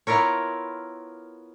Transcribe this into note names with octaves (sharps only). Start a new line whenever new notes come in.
B3 E4 F4 A#4 C#5